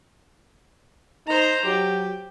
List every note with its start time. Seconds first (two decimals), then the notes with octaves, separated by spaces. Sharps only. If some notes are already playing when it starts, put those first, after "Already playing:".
1.28 D#4 C5 A#5
1.65 F#3 G4